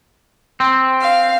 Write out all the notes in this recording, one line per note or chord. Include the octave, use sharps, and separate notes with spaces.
C4
F5